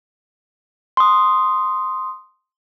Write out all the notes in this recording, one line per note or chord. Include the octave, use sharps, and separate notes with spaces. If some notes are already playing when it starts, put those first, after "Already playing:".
C6 D#6